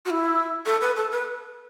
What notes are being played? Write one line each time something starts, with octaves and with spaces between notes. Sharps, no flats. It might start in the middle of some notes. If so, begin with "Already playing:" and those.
F#4
E4
A4
B4
A4
B4